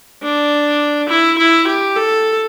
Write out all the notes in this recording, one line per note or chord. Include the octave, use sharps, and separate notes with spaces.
D4
E4
E4
G4
A4